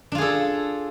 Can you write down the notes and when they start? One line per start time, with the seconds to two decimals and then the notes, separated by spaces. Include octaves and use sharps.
0.12 D4
0.15 F4
0.18 G#4
0.22 A4